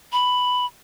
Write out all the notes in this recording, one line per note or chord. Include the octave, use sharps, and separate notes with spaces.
B5